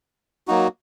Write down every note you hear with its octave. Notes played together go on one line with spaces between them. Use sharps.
F#3 A#3 D#4 F#4